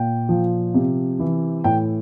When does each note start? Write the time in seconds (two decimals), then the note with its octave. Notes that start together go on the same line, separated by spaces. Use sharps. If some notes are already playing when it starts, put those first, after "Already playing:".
Already playing: A#2 G5
0.29 F3
0.74 C3
1.19 E3
1.64 A2 G5